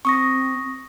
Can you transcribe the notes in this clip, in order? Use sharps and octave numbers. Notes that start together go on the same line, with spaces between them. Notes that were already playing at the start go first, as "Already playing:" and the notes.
C4 C#6 D#6 A#6